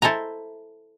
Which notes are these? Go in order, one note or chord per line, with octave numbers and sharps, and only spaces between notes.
E4 A4 C5 G#5 A#5